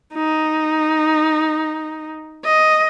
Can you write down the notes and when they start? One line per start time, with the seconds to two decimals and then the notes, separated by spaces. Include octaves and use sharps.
0.14 D#4
2.45 D#5